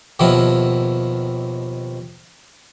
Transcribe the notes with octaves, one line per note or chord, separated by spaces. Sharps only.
D#2 B2 D#3 F3 E4